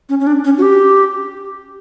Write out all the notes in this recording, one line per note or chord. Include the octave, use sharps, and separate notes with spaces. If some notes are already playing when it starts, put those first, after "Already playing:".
C#4
C#4
D4
C#4
F#4
G4